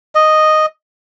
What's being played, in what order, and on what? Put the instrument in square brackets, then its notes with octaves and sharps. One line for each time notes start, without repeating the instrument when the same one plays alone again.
[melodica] D#5